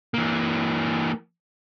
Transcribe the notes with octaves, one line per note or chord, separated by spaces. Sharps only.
E3 A#3